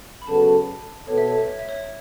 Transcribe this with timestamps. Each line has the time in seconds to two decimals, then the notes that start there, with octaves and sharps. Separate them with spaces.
0.22 B5
0.27 C#3 F#3 B3 F#4 A4 A5
1.08 B2 B3 A4 C#5
1.18 E5
1.28 C#5
1.38 E5
1.48 C#5
1.59 E5
1.69 C#5